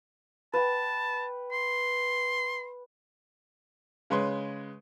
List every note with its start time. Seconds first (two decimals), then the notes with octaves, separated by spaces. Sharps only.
0.53 B4 G5 A5
1.52 C6
4.10 C#3 G#3 B4 C#5 C6